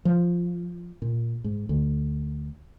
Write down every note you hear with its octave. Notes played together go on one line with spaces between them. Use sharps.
F3
A#2
G#2
D2